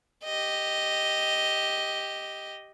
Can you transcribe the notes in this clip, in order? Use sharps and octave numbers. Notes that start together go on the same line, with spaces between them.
G4 D#5